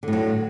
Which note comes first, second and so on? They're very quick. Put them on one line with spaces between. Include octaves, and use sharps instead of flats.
D3 A2 F#3